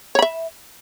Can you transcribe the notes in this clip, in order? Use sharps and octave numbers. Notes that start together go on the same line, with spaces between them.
C#5 E5 B5